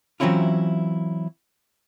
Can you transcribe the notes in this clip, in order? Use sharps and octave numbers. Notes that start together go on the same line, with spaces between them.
E3 F#3 C4 C#4 E4 F4